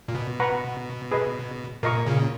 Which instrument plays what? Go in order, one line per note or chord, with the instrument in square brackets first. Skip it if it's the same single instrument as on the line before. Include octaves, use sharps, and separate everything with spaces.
[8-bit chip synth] A#2
B2
[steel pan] B4 F#5 A#5 C#6
G#4 B4 D#5
[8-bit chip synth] A#2 [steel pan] A#4 D#5 A#5 C#6
[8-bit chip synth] A#2 C#3